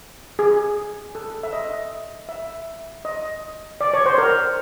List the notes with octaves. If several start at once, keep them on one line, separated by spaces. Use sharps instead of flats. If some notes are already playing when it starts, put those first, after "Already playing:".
G#4
A4
E5
D#5
E5
D#5
D5
C#5
C5
A#4